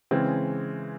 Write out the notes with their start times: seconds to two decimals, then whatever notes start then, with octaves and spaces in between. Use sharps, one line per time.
0.11 C#3 E3 G#3 C4